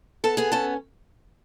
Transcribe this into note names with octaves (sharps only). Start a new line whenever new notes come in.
B3 A4 A5
B3 G#4 G#5
C#4 A4 A5